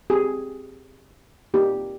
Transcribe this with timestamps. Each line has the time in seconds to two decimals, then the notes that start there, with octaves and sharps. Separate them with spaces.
0.10 C4 G4 G#4
1.54 A#3 D#4 G4